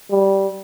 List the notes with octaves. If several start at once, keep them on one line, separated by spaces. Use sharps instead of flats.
G3